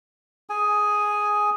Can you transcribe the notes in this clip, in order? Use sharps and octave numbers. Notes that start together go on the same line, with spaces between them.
G#4 G#5